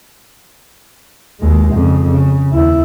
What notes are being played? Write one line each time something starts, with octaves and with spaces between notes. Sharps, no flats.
D#2 G#3
F2 C#3
C#3
D#2 E4